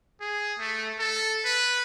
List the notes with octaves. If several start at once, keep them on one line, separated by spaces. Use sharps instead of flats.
G#4
A3
A4
B4